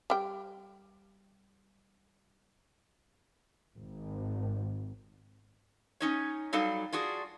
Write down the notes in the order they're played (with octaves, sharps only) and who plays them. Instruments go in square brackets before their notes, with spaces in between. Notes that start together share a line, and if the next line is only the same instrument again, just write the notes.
[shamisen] G3 G5
[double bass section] G#1
[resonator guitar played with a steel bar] C#4 D#4 C#5
F#3 G3 D#4 A4 F5
D4 F4 F#4 G#4